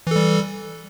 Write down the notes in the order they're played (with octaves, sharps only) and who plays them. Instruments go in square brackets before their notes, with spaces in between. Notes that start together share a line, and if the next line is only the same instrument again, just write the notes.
[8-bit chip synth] E3
A4
G3